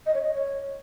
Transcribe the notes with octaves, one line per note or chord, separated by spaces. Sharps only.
D#5
C#5
D#5
C#5